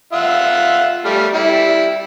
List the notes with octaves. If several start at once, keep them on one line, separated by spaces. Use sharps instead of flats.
F4 E5 F#5
G3 A3 F6
G3 E4